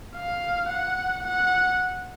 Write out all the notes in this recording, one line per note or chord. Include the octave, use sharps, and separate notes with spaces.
F5
F#5
F#5